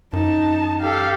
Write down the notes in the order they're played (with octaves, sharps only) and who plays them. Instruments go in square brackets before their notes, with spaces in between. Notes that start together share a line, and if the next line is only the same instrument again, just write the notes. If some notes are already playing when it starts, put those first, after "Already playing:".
[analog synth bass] F#2 [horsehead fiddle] D#4 A5
[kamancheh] G4 A4 [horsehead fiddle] F5